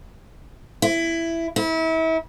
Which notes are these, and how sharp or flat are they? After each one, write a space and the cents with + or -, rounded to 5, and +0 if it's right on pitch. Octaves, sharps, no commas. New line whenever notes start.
E4 +10
E4 -35